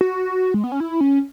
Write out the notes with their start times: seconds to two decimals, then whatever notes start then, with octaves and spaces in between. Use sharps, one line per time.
0.01 F#4
0.54 G#3
0.64 B3
0.72 C#4
0.80 E4
1.01 C#4